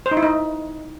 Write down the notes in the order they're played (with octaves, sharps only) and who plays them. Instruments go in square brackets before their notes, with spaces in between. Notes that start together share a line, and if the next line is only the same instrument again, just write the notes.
[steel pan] C5
D#4
E4
D#4